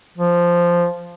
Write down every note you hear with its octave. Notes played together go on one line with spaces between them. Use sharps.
F3